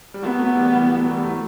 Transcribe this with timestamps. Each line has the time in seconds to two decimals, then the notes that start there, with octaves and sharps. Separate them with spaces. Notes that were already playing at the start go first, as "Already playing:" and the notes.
0.14 G3
0.22 F#3 A3 B3
0.39 F#3 A3
0.56 E3 G3
0.73 E3 G3
0.98 F#3 A3
1.11 E3 G3
1.24 F#3 A3